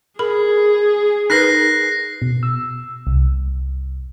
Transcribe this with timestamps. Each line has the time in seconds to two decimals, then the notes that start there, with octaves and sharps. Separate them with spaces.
0.19 G#4 A#4 B5
1.30 D#4 A#4 B4 F#6 A#6 C7
2.22 B2
2.43 E6
3.07 C2